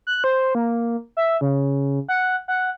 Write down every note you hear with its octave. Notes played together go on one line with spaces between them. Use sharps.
F#6
C5
A#3
E5
C#3
F#5
F#5